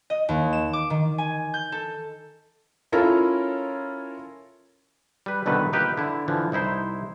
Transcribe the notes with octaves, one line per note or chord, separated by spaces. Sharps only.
D#5
D#2
E7
D6
D#3
G#5
G6
A4
C#4 E4 F4 A4 A#4 C#5
G3 B4
C2 B2 D3 D#3 A4 B4
A#3 D#4 F4 G4 B4
D3 E4
D3 E3 F3
C2 D#4 E4 C5